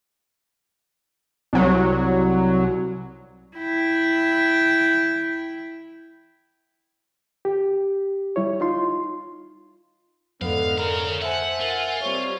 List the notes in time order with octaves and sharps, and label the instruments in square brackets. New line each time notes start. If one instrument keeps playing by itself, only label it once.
[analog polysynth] C2 F#3
[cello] E4 G5
[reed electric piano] G4
G3 E4 C#5
D#4 F4 C6
[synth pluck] F2 [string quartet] G#2 D3 [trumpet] B3 [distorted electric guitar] F5
[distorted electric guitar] C#4 F5 [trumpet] A#4
[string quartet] C5 G#5 A5 [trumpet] E5 [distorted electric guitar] F#5
[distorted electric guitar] F4 [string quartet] A#4 F#5 G#5
[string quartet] C3 G3 C5 [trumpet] C#5